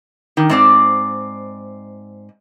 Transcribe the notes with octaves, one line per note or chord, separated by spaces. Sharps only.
D#3
G#2 C4 D5